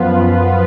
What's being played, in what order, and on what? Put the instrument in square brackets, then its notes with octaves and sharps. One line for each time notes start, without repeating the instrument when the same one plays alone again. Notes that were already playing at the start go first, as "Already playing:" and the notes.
Already playing: [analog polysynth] F#2 F3 B3 F4 B4
F#2